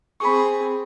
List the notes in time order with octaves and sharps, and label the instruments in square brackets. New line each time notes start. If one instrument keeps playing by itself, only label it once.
[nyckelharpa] C4 G#4 [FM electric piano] B5 C#6